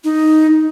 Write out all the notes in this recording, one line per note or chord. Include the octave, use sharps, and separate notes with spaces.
D#4